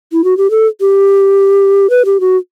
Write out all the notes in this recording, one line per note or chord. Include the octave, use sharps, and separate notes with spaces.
E4
F#4
G4
A4
G4
B4
G4
F#4